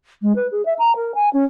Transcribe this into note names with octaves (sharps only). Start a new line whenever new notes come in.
G#3
B4
G#4
E5
A#5
A#4
G#5
C#4